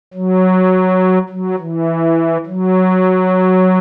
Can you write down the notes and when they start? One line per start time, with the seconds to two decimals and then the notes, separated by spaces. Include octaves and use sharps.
0.14 F#3
1.29 F#3
1.59 E3
2.46 F#3